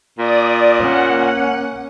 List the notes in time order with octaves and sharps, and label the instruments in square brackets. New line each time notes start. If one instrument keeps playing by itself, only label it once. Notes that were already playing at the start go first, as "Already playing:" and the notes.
[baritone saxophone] A#2 [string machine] D5 D#6
[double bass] A#3 C#4 [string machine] F#5